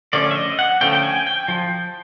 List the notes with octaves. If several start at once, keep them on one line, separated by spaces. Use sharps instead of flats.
D3 F3 A3 C#4 D5
E5
D#5
F#5
D3 F3 A3 C#4 G5
G5
G#5
G5
F3